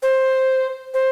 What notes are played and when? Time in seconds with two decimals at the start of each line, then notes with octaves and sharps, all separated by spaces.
0.03 C5
0.94 C5